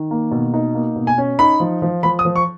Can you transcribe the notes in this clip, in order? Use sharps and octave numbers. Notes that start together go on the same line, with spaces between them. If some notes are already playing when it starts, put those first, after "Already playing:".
Already playing: D#3
A#3
B2
D#4
A#3
B2
G#5
C#4
D#4 B5
F3
F3
F3 B5
D#6
F3
C#6